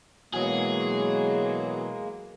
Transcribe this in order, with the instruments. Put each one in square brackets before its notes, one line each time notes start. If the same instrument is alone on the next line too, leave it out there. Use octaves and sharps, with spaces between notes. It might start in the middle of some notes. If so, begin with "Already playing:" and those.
[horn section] B2 E3 F#3 [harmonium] G#3 A#3 [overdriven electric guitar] G#4